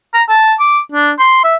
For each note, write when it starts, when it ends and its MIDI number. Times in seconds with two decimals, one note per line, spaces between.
0.14 0.23 82
0.29 0.54 81
0.60 0.80 86
0.92 1.11 62
1.19 1.40 84
1.44 1.56 76